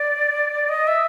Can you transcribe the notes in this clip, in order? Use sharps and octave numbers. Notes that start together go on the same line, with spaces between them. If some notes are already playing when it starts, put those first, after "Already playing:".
Already playing: D5
D#5
E5